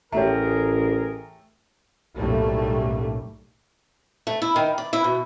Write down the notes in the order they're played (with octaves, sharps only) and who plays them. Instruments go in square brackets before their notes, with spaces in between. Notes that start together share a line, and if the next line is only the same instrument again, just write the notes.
[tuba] A1 [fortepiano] A3 G4 [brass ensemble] G#4 A#4 [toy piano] C#5 F#5 A#5
[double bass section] B1 F#2 A2 G3 A3 A#3
[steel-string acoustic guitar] A3
E4
D#3
D5
E4
B2